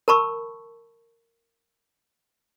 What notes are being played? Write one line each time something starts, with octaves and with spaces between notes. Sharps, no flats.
A#4 A5 B5 C#6 E6